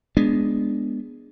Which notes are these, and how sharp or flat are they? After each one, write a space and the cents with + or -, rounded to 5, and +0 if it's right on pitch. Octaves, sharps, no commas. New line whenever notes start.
G#3 +0 B3 +0 D4 +0